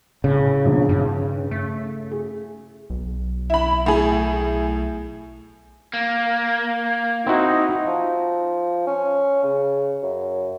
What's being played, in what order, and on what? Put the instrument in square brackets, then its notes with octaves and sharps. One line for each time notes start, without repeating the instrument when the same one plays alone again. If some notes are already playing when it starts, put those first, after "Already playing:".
[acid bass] A2 [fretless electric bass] C#3
[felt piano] A#1 G2 B2
[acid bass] G2 [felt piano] D#3
[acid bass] A3
[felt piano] G#4
[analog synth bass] B1
[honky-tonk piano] E4 B5
A2 G#4
[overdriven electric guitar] A#3
[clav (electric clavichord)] C4 E4 F#4 [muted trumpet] D#4
[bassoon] F3
C#4
C#3
F#2